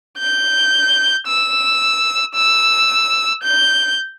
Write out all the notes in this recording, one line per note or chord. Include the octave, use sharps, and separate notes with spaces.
G6
E6
E6
G6